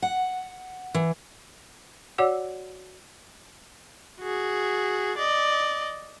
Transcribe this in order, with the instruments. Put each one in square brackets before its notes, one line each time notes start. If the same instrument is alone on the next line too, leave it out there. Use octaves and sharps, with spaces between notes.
[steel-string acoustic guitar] F#5
E3
[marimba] F#4 C#5 D5 F#5 D6 E6
[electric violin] F#4 G#4
D5 D#5